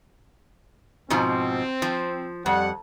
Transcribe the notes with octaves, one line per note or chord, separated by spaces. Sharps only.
G#2 B2 F3 C4
F3
F2 G3 F#5